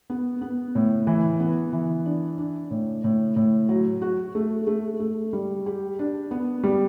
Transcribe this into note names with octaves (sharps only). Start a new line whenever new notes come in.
B3
B3
A2
E3
B3
E3
D4
D4
A2
A2
A2
F#3
F#4
A3
A3
A3
G3
G4
D4
B3
G3